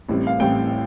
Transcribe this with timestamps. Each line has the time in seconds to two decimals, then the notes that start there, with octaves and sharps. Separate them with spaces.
0.08 A1 A2 G3 C4
0.27 F5
0.40 A1 A2 G3 C4 G5